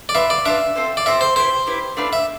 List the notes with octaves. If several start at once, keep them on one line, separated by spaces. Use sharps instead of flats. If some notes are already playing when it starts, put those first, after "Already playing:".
D5
D4 F4 B4 E5
D5
D4 F4 B4 E5
C4 F4 A4 C5
D5
C4 F4 A4 C5 E5
C5
E4 G4 B4 C5
E4 G4 B4
A3 D4 F4 B4
E5